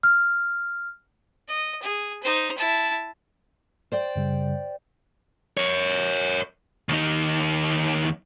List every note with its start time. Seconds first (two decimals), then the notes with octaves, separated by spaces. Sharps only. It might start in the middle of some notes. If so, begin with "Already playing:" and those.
0.03 F6
1.49 D#5
1.82 G#4
2.23 D#4 C5
2.58 E4 A5
3.92 C5 D5 G5
4.16 F#2 C#3 G3
5.57 A#4 C#5
6.89 D#2 D#4